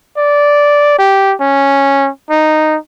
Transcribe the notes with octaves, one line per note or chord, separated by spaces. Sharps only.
D5
G4
C#4
D#4